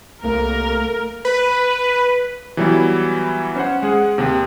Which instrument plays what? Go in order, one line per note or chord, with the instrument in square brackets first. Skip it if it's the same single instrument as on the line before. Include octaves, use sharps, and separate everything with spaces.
[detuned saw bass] C2 [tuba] A3 [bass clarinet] A#3 [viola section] A#4
[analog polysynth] B4
[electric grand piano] E3 F#3 G3 B3 E4
C#4 C5 F#5
G#3 G#4 F#5
D#2 C3